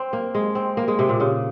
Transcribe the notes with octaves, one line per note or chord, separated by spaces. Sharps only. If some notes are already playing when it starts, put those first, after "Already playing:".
Already playing: C4
A#3
G#3
C4
A#3
G#3
C3
A#2
C#3